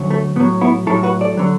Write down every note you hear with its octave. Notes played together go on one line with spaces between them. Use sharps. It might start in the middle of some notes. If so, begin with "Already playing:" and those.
Already playing: D2 D3 F#3
A3
A2 F#3 B3
B3 E4
A2 F#3 E4 A4
F#4 B4
A4 D5
D3 F#3